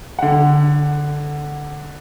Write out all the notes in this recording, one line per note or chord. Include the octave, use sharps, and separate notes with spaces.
D3 F#5